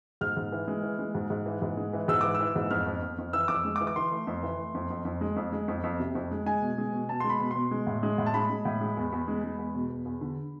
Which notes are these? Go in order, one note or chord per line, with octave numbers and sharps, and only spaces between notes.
G#2 F6
G#2
E3
G#3
E3
G#3
G#2
G#2
E3
G#2
G#3
E3
G#2 E6
E3 D6
E6
E3
G#2
F2 F6
F2
F2
F2
E3 E6
F2 D6
E6
G#3
D6
E3
D6
E3 C6
A3
F2
E3
A3
F2
F2
F2
G#3
F2
G#3
F2
F2
C3
F2
G#3
G#3 G#5
B2
G#3
B2
B2 A5
G#3 C6
B5
B2
B2 C6
G#3
A2
G#3
A2
A5
G#3 B5
G#3
A2
G#3
E2
E2
G#3
G#3
E2
B2
E2
E2
D3